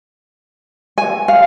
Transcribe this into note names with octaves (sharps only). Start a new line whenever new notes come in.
G#5
F5